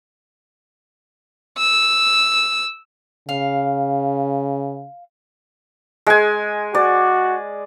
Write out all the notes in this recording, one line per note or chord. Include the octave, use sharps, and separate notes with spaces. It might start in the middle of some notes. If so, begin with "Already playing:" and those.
E6
C#3 F5
G#3 G#5
F#4 D5